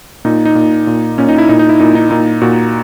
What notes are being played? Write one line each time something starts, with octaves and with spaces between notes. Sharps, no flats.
A#2 D#4
D#4
A#2
A#2
A#2 C#4
D#4
E4
A#2 D#4
D#4
E4
A#2 D#4
D#4
A#2 D#4
A#2 F#4